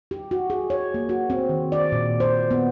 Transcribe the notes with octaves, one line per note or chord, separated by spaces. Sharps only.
G4
F#4
G#4
C#5
A#3
F#4
C4
D#3
D5
A#2
C5
B3